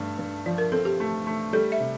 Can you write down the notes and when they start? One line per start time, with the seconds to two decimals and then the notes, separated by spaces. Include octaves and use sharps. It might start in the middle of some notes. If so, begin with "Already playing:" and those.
Already playing: G2 A3
0.18 G2
0.46 F3 D5
0.58 A#4
0.72 C4 A4
0.85 G4
1.00 A3
1.27 A3
1.53 G3 A4
1.72 E5
1.80 C3